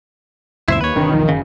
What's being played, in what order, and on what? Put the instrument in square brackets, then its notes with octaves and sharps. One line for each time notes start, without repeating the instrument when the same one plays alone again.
[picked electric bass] C#2 F#2 A#2 [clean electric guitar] E4 C5 E5
[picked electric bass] D#2 [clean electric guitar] B4 C#5
[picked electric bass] G1 C3 D4 [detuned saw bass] D#3
[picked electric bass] B1 E2 F3
[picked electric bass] F#1 [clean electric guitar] C#3